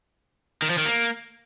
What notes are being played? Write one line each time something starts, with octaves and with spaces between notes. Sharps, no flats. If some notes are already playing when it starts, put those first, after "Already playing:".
D#3
F3
D#3
A#3